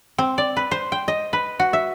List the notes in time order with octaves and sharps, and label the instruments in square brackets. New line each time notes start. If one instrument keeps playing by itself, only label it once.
[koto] C4
D5
B4
C5
G5
D#5
B4
F#4
E5